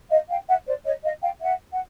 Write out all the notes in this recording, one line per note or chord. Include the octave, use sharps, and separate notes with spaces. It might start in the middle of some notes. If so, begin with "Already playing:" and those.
D#5 F5
F5 G5
E5 F#5
C5 D5
C#5 D#5
D#5 F5
F5 G5
E5 F#5
F#5